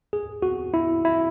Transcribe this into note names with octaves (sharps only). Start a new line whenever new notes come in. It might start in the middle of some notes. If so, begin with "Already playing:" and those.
G#4
F#4
E4
E4